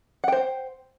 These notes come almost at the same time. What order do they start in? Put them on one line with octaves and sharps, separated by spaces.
F#5 G5 C5